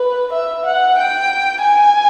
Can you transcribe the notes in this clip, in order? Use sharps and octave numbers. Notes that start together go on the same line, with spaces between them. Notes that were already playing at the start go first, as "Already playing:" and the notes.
Already playing: B4
E5
F#5
G5
G#5